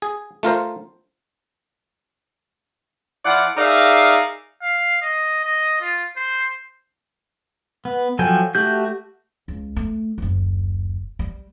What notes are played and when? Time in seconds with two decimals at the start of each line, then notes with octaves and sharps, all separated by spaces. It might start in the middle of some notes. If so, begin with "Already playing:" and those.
0.02 G#4
0.43 A3 F4 A#4 C5
3.24 F3 E4 D5 F#5
3.57 D#4 G#4 A#4 D5 E5 F5
4.62 F5
5.02 D#5
5.45 D#5
5.81 F4
6.17 C5
7.85 B3
8.19 F3 F#3 A4 G5 G#5
8.55 A3 F#4 G4 G6
9.48 C#2
9.76 A3
10.18 F#1 D2
11.19 G3